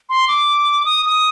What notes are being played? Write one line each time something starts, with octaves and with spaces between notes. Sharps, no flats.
C6
D6
D#6
D#6